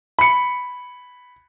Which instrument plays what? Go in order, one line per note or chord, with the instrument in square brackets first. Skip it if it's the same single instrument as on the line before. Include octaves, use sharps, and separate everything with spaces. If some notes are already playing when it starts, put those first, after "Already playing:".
[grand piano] B5 C#7